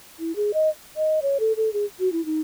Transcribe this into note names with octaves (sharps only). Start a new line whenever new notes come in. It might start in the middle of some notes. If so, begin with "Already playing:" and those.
E4
G#4
D#5
D#5
C#5
A4
A4
G#4
F#4
E4
D#4